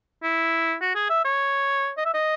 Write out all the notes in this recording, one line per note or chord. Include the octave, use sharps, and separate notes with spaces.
E4
F#4
G#4
E5
C#5
D#5
E5
D#5